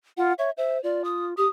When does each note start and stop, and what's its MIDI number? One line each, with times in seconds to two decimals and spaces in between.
0.17 0.33 65
0.17 0.34 78
0.38 0.50 73
0.38 0.51 76
0.57 0.82 72
0.57 0.78 76
0.83 1.34 65
0.83 1.02 74
1.04 1.26 87
1.37 1.46 67
1.37 1.48 87